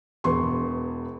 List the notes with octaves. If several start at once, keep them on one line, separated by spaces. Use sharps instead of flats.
E1 E2 B4 C6 C#6